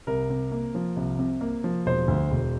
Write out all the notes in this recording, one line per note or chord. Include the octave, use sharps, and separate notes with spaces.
C2 A#4
C3
A#3
F3
C2
C3
A#3
F3
E1 C5
D2
E1